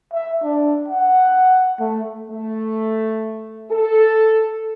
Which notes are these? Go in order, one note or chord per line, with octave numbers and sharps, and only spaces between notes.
E5
D4
F#5
A3
A3
A4